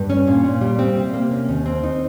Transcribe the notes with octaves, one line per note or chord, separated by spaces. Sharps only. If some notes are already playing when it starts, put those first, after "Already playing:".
Already playing: G2
C#4
A#2
A#2
G3
C4
C3
A#3
C#4
D#2
C4
D#4